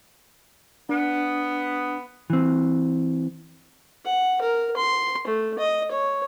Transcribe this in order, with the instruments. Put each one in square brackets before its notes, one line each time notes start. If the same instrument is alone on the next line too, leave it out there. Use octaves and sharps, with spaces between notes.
[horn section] B3 [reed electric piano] D4
[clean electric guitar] E3 C4
[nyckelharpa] F#5
A#4
C6
A3
D#5
C#5